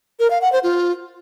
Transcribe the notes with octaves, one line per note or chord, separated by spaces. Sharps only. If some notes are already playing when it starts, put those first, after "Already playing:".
A#4
F5
F#5
C5
F4